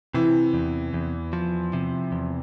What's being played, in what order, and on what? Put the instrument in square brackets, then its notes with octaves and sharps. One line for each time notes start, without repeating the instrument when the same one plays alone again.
[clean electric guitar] C3 [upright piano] E3
[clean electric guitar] E2
E2
F3
C3
E2